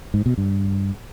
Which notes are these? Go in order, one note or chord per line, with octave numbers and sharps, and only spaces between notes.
G#2
B2
G2